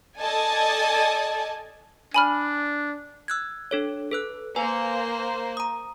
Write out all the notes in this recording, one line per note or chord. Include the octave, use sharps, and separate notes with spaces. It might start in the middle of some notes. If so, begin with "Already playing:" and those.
A4 D5 D#5 G#5 A5
D4 G#5 B5 F6
E6 F#6 G#6
D4 A4 C#5
A4 B4 F#6
A#3 B4 C5 G#5
A#5 D#6